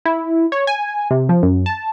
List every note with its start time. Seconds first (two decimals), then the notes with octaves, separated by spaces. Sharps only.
0.05 E4
0.52 C#5
0.67 G#5
1.11 C3
1.29 F3
1.43 F#2
1.66 A5